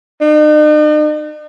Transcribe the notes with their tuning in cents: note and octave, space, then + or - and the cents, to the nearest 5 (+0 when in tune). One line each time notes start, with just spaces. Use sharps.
D#4 -45